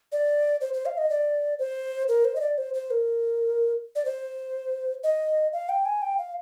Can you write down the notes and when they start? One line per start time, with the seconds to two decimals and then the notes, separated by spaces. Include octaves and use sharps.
0.12 D5
0.61 C5
0.74 C5
0.86 F5
0.98 D#5
1.10 D5
1.59 C5
2.08 A#4
2.25 C5
2.36 D#5
2.41 D5
2.58 C5
2.74 C5
2.91 A#4
3.95 D5
4.05 C5
5.04 D#5
5.53 F5
5.69 G5
5.85 G#5
6.02 G5
6.18 F5